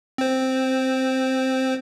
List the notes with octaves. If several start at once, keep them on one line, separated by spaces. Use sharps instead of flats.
C4 C5